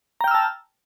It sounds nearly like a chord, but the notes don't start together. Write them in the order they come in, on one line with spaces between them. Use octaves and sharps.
A#5 G5 F6 E6 A5